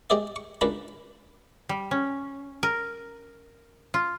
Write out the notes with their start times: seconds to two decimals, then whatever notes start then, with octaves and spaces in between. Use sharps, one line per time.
0.10 G#3 G4 G#4 C5 D5 E5
0.36 C#6
0.61 C#2 D4 A#4 B4 A5 B5
1.69 G3
1.91 C#4
2.63 A#4
3.94 F4